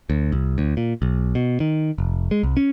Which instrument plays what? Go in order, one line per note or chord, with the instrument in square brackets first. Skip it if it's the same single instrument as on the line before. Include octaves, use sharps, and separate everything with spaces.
[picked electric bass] D2
C2
D2
A#2
B1
B2
D#3
F1
G#3
C2
C#4